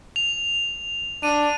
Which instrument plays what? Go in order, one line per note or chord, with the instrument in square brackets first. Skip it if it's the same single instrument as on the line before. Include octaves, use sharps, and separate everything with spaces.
[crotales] F7
[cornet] D4 [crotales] D#7